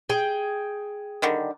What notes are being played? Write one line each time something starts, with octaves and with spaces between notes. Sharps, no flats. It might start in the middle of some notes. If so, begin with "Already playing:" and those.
G#4 G5
D3 D#3 G3